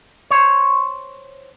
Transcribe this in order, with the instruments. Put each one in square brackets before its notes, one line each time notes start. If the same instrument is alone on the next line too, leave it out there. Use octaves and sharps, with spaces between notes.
[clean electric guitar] C5 C#5